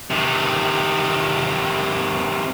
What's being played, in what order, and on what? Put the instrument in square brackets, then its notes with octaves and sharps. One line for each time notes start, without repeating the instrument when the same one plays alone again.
[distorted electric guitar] C3 D#3